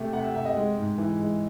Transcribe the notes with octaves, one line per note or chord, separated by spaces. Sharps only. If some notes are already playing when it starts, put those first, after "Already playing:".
Already playing: C3 A3
C3 F#5
E5
C3 E5
D#5
G#3
G#2
E3
G#3